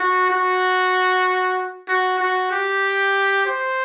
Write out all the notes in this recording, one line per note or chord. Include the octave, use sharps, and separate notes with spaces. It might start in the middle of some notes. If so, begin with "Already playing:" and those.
Already playing: F#4
F#4
F#4
F#4
G4
C5